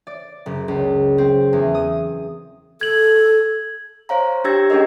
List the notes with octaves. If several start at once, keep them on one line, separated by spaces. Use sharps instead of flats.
D5
F#1
C#2
C4
E2
D#6
A4 G#6 F#7
C5 C#5 F5 A#5
D4 G4 C#5 E6 G#6 A#6
C#4 D4 G#4 A#4 D#5